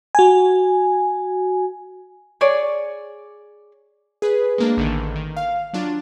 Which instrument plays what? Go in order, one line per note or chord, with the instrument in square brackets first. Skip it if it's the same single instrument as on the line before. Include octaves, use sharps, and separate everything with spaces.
[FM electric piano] F#4 G#5
[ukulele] G#4 C#5 D5
[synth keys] G#4 B4
G#3 A#3 D4
A1 D3 D#3
D#3
F5
F#3 D4 F4